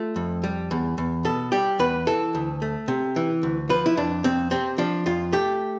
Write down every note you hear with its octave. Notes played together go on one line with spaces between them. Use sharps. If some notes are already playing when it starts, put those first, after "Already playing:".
Already playing: A3 F4
F2
G3
E2
E2
B2 A4
G3 G4
E2 B4
E3 A4
D2
A3
C3
E3
D2
F3 B4
E4
F2 D4
F2 C4
C3 C4
F3 D4
F2 F4
A3 G4